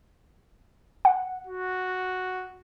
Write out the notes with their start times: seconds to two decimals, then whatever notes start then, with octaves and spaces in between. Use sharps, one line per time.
1.05 F#5
1.47 F#4